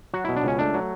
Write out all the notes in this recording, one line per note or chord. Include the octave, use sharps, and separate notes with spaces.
F#3 F#4
B2 E4
D4
C#2 C#4
A3 D4
F#3